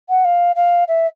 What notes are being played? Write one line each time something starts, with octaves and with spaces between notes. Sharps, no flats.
F#5
F5
F5
E5